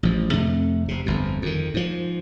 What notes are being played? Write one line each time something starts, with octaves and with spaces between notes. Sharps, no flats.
A1 F3
F2 C3 A3
F1 C3
G1 F2
F2 D#3
G#2 F3